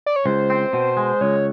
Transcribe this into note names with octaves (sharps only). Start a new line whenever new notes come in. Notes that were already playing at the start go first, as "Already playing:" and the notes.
D5
C#5
C#2 C5
C4
B2
G#3
C#2 C#5